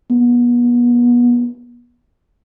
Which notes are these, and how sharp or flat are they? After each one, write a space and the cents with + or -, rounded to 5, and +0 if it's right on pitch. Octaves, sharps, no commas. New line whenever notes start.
B3 -35